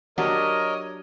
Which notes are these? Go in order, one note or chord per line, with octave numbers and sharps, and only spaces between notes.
F#3 D4 G4 A#4 C#5 D#5